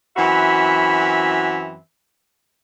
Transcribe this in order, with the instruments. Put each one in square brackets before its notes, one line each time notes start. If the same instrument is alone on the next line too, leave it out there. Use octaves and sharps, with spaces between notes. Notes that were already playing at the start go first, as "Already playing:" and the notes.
[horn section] F#2 E3 C4 F#4 E5 B5